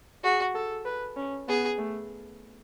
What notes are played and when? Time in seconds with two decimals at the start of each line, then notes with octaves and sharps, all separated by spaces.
0.24 F#4 G#4
0.55 A4
0.85 B4
1.17 C#4
1.48 B3 G#4
1.79 A3